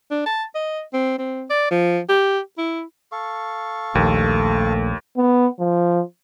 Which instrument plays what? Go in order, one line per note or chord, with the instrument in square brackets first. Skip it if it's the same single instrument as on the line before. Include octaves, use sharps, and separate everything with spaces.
[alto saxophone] D4
A5
D#5
C4
C4
D5
F3
G4
E4
[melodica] A4 F5 C#6
[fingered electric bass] A#1 [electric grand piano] D#2 [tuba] A3
[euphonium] B3
F3